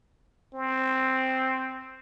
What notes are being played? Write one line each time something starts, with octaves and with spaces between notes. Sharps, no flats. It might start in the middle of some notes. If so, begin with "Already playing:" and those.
C4